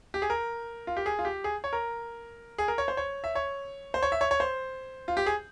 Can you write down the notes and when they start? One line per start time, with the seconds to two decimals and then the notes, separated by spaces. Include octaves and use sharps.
0.14 G4
0.22 G#4
0.30 A#4
0.87 F4
0.97 G4
1.06 G#4
1.19 F4
1.25 G4
1.44 G#4
1.64 C#5
1.73 A#4
2.58 G#4
2.68 A#4
2.78 C#5
2.88 C5
2.97 C#5
3.24 E5
3.35 C#5
3.94 C5
4.02 C#5
4.12 E5
4.21 C#5
4.31 C#5
4.40 C5
5.08 F4
5.17 G4
5.26 G#4